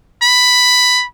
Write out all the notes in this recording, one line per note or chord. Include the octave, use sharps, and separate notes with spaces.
B5